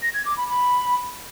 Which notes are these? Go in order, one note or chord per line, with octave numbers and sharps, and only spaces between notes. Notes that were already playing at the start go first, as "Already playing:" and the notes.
A#6
G#6
D6
B5
B5